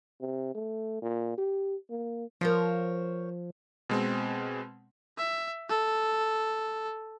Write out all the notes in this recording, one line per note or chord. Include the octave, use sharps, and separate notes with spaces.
C3
A3
A#2
G4
A#3
F3 A#4 C5 C#5
B2 G#3 C4
E5
A4